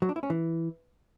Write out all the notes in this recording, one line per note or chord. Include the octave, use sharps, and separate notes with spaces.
F#3
D4
E4
C#4
E3